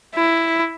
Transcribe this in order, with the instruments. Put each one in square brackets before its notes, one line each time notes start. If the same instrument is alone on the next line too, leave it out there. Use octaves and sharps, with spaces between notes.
[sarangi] E4